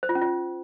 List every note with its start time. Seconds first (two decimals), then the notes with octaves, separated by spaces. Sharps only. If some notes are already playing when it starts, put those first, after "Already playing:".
0.03 C5
0.09 F4
0.15 C#4
0.22 F4